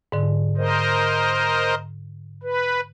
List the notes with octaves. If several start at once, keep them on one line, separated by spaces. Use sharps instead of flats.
G#2 D3
A#4 C5 D#5
B4